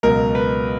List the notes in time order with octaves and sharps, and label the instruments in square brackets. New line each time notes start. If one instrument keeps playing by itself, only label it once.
[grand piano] C#2 B2 F#3 A#4
B4